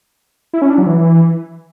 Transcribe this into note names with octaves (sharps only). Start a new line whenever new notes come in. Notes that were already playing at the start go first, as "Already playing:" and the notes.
E4
C#4
D4
F#3
E3